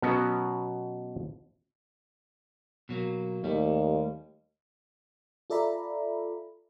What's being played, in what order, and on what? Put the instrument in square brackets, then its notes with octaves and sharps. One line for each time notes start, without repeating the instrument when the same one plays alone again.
[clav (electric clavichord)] B2 F#3 B3 C#4 F#4
[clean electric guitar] B2 F#3 A#3
[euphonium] D#2 [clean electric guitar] G3 A3
[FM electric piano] F4 A4 D5 E5 A#5 B5